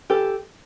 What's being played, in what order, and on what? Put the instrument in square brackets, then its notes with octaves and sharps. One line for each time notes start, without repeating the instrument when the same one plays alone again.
[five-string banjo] E3 G4 A4